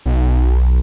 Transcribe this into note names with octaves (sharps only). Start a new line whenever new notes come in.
B1